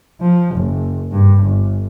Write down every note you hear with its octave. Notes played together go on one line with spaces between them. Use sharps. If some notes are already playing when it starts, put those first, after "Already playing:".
F3
F#1
G2
G1